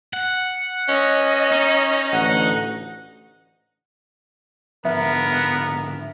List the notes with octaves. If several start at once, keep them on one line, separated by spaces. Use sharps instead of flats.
F#5
C#4 D#5
D#4
A1 D2 F#5
G#2 D3 F3 B3 A#4 E5